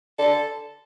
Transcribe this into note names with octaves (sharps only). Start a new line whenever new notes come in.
D3 A4